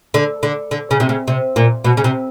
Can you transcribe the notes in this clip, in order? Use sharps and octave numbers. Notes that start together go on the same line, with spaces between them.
D3
D3
D3
C#3
C3
C#3
C3
A#2
B2
C#3
C3